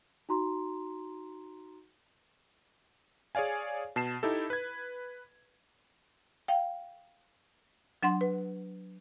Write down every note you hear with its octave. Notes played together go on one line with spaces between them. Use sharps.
D#4 F#4 A#5 C6
G#4 C#5 D5 F5 G#5
B2 A5 C7 E7
D#4 E4 G4 A4
B4 G#6
F5 G5
F#3 D4 F#5 C6
B4